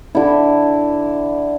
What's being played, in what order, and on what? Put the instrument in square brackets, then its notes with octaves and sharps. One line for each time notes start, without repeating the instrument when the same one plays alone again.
[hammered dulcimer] D3 E4